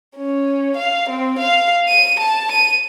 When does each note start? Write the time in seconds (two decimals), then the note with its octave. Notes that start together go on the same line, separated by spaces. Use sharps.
0.16 C#4
0.76 F5
1.09 C4
1.38 F5
1.88 D#7
2.20 A5
2.51 D#7